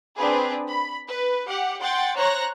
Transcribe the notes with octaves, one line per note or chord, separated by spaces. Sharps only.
C4 D4 G#4 B4
B5
B4
G4 F#5
F#5 G5 C6 A6
C5 C#5 A#5 F#6 A#6